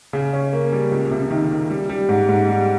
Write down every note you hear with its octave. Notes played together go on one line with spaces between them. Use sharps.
C#3
C#4
A#3
G3
C#2
C3
D#3
D#3
G3
G3
G#2
G#2
G3